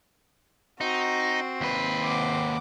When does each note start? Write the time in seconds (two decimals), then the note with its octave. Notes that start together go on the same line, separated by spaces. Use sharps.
0.81 C4 D#4 F#4
1.61 D#2 B4
2.03 F#5 D6